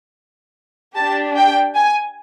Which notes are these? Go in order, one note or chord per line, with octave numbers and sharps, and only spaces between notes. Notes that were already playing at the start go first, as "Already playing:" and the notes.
D4 G4 A5
G5
G#5